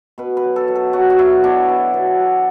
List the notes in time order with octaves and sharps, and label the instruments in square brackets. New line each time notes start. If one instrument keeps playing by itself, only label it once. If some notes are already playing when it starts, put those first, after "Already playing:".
[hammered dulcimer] B2 B4
B4
F#3
A4
F#3
A4
F#3 F#4
F#4
F#3 E4
B2 D4
B2
B2
F#3